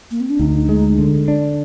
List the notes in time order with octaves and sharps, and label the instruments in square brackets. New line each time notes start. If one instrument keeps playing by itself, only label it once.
[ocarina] A#3
C4
D4
[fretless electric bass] D2 [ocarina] D#4
[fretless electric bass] G#3
D3
D4